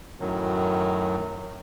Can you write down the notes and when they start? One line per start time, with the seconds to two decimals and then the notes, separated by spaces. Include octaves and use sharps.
0.20 F#2 A2 D#3 F#3